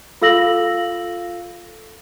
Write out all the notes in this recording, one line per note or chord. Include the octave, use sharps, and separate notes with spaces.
F4 A4 F5 E6 A#6 F#7